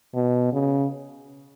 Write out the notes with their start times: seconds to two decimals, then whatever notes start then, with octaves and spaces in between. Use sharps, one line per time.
0.14 B2
0.53 C#3